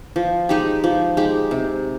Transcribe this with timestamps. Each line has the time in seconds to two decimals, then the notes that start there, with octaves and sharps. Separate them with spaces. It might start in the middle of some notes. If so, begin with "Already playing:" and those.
0.16 F3
0.49 G#3 D#4 G4
0.84 F3
1.17 G#3 D#4 G4
1.51 C3